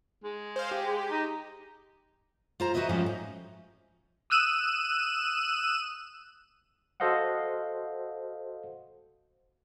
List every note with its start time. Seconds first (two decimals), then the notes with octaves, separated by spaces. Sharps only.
0.24 G#3
0.56 C5 F5
0.71 G4
1.11 D#4
2.60 F4 C5 A#5
2.74 F#4 B4 C5 D#5 E5
2.89 G#2 F3 A3 C#4 F4 G4
3.06 D#4
4.30 D#6 E6 F#6 D#7 E7
7.00 F#4 A4 C5 D#5 F5 F#5